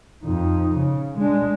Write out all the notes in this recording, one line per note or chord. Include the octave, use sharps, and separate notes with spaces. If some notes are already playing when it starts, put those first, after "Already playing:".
F2 D#4
C#3
G#3 D4